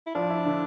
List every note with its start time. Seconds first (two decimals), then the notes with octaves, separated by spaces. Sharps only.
0.06 E4
0.15 F3 D4
0.30 E4
0.45 D3